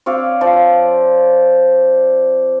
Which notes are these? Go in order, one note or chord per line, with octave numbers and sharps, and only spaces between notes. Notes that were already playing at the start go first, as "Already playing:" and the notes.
C4 C#5 D5 F5
F3 F4 C5 D5